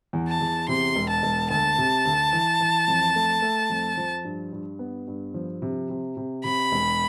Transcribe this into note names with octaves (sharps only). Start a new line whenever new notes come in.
E2
A5
E2
C3 C6
E1
A5
E1
D2 A5
C3
D2
E3
E3
F2
A3
A3
F2
F3
G2
G2
B3
G2
F3
C3
C3
C3
C3 B5
E1